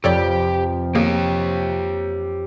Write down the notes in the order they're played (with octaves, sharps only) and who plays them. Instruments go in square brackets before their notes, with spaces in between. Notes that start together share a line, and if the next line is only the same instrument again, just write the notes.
[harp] F2 B4 [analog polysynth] C3 F3 [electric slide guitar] G4 [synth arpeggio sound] A4 C#5 D5
[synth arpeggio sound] D#3 A#3 G#4 [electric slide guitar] G4 C#5